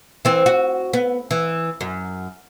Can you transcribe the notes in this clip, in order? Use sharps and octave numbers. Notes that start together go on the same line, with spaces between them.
E3 C4
F#4
B3
E3
F#2